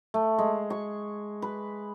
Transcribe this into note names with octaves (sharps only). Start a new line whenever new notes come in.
A3
G#3
C#6
B4